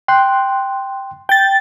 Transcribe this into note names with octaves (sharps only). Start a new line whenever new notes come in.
G5 C6 F#6
G5 A6